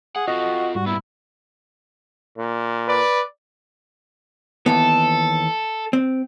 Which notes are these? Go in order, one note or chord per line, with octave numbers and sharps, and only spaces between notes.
G#4 F#5
F4 F#4 A4 D#5 F#5
G#2 G3 F#4
A#2 B3 E4
A#2
B4 D5
D#2 E3 B3 A4
C4